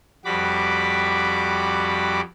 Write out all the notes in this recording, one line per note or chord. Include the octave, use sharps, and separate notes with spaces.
F2 G3 F#4 B5 D6